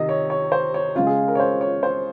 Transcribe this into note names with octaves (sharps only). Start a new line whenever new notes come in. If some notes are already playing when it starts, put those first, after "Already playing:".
Already playing: C3 D#3 D#5
C#5
C#5
C5
C#5
C#3 G#3 F4
G#4
A#4
C#5
C5
C#5
C5